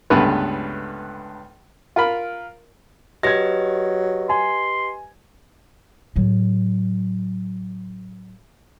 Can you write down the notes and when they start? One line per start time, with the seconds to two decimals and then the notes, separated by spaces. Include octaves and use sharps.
0.10 C#2 G2 D3 A3 B3 B4
1.96 F4 A#4 B5
3.23 F#3 G4 B4 D#5 G#6 A#6
4.30 G#5 C6
6.16 A2 F#3